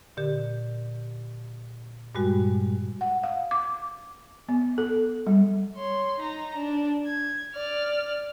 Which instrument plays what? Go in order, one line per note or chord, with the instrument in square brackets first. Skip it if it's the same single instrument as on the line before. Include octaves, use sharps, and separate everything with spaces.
[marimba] A#2 D3 G4
G2 A#2 G3 G#3 F#4
[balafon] F#5
F5
D6
B3
A4
G3
[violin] C#5 C6
D#4 A#5
D4
G#6
D5 F6